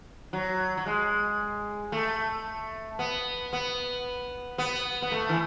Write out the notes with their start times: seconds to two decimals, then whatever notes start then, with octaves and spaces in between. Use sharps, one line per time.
0.33 F#3
0.77 F#3
0.86 G#3
1.92 A3
2.99 B3
3.53 B3
4.58 B3
5.02 B3
5.12 A3
5.29 E3